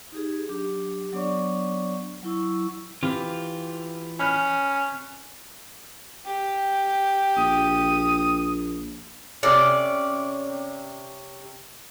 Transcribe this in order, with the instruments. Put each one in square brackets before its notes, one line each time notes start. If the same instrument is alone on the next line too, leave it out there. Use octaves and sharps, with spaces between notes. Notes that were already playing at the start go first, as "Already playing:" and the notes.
[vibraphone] D#4 G4 G#4
F#3 D4 G4
F#3 B3 D4 C#5 D5 C#6
F#3 E4 C#6 E6
[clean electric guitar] E3 F4 [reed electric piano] C4 [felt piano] G4
[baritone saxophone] C#4 [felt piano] B5 F6 F#6
[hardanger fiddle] G4
[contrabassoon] A#1 [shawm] D#6
[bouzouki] C3 C#4 D5